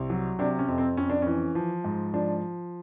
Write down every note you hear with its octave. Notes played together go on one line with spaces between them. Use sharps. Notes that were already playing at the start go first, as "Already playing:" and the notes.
Already playing: C2
F#3
C3 D4
C#4
F2
C4
F2 C#4
D4
E3 C#4
F3
G#2
F3 D4